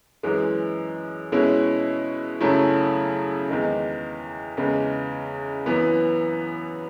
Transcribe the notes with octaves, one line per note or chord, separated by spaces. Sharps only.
F#2 E3 G#3
B2 G#3 C#4 E4
F#2 C#3 F#3 A3 E4
E2 D#3 G#3 D#4
E2 C#3 G#3 D#4
F#2 E3 B3